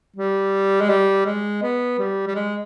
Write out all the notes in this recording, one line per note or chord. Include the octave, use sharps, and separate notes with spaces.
G3
G#3
G3
G#3
B3
G3
G3
G#3